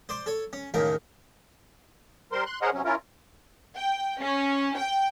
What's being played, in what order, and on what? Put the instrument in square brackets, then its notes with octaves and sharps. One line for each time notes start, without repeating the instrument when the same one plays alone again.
[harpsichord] C5 D5 C6
A4 C#5
C#4
D#2 A2 C#3 A#4
[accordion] G3 A#4 C5 C6
C6 F#6
G#4 A#4 C5 C#5 D#5 F#5
C3 F#3 C#4
C#4 E4 F4 A#4
[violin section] G5
C#4
G5